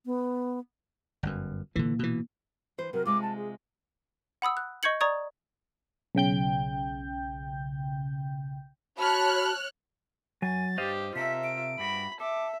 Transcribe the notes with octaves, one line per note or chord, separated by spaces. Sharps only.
B3
G1 F#2
A#2 D3 E3
B2 E3
E3 C5
C3 F#3 A#4
C3 G#3 F4 D6
A5
G#4
F#5 B5 D#6 E6
F#6
D#5 C#6 G6 G#6 C#7 F#7
D5 A#5 C#6 D#6 G#6
B1 C#3 G5 G6
F#4 C#5 A5 B5 F6 F#6
F#2 F#3 G#5 A6
G2 G4 C5 D#5 F5
C3 F4 A4 A#4 E5 B6
D7
G2 G3 F#4 B5
A4 E5 D6